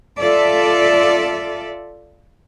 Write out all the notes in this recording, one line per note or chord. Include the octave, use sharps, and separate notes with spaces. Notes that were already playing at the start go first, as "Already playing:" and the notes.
F4 A4 D5 E5